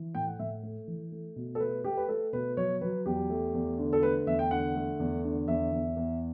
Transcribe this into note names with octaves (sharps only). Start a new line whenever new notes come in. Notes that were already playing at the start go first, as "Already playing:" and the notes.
Already playing: E3
A2 G5
F#5
A2 E5
A3
E3
A3
B2
A4
A3 B4
A3 G4
B4
A3 A4
B2 B4
F#3 C#5
F#3 B4
E2 G4
A3
E2
D3
A4
A3 B4
E2 E5
G5
D3 F#5
A3
E2
D3
E2 E5
E2
E2